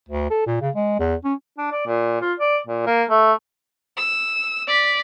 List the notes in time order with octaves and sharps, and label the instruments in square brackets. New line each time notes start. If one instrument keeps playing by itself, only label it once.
[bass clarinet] D2
A4
A#2
C#3
G#3
E2
C#4
[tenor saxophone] D4
D5
A#2
F4
D5
A#2
A#3
A3
[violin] E6
D5 B6